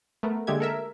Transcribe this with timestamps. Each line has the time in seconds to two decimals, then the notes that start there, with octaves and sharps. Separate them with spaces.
0.23 A3 B3 A#4
0.47 D3 G#3 A#3 G4 E5 G#6
0.60 A4 A#4 E5